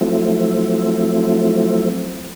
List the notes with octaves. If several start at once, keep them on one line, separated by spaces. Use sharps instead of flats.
F3 F#3 A3 C4 E4